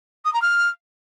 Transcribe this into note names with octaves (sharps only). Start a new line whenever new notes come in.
D#6
A#5
F6